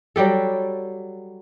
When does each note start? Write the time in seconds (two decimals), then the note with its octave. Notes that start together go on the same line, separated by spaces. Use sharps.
0.16 F#3 G3 G4 A4